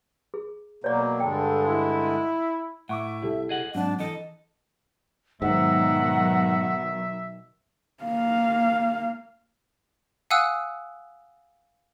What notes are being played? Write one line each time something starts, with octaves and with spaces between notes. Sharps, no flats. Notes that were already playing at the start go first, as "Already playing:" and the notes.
G#4
B2 F#3 A#3 C#5 D5
G2 D3 G#3 A4 G5
E4
A2 E5 F#5 C#6 D6
C2 E4 G4 A4
G#4 D#5 F#5
G#2 F#3 C4 D4 F#5
E3 A4 D#5
G#2 B2 D#3 F#3 E5 F#5
A#3 F5
F5 F#5 G#5 D#6 E6 F#6